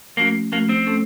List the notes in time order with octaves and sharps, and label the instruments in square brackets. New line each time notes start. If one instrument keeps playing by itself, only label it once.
[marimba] F3 A3 C#4 F#4 [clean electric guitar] A#3
[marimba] F3 A3 C#4 F#4 [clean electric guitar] A#3
[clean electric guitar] C4
[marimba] A3 C#4 A4